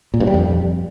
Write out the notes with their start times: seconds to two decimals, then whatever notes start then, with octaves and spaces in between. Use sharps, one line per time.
0.14 A#2
0.20 G2
0.27 G3
0.34 F2